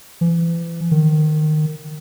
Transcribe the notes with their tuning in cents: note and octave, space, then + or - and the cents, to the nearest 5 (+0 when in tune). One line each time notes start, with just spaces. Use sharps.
E3 +35
D#3 -20